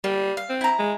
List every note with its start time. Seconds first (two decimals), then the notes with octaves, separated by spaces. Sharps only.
0.04 G3 A#3
0.37 F5
0.49 C4
0.61 E4 A#5
0.79 G#3